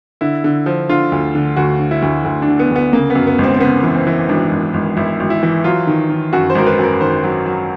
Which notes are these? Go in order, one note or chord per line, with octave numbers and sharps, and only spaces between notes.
D3 E4
D3
F3
D3 F4
D2
D3
D2 F#4
D3
E4
D2
D2
D4
D3
B3
D2 B3
C#3 A#3
B3
F#2
B3
G#1
C4
C4
C#3 B3
E3
C4
E3
G#1 D4
G#1
G#1
G#1 E4
G#1
E4
E3
F#3 F4
D#3
D#3
F#2 F#4
C5
G#1 A#4
B4
F#2 A#4
D#3 C5
F#3
F#3